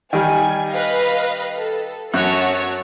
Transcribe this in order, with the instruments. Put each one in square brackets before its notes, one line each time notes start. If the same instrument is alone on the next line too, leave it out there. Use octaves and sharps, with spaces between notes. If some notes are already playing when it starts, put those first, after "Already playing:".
[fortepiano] D#3 G3 [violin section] G#5
[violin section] B4 D#5 F5
A4
[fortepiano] F#2 F#6 [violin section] F#4 C#5 A5